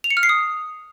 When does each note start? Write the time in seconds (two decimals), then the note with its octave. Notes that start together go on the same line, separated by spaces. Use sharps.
0.04 F7
0.10 C#7
0.17 F6
0.23 C7
0.29 D#6